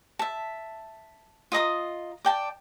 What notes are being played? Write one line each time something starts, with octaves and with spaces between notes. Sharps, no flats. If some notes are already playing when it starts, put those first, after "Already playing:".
E5 A5
F4 D#5 A#5 D#6
D5 G5 A5